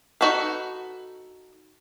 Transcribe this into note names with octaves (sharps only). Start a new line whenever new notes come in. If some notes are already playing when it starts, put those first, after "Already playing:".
D#4 F#4 A4 B4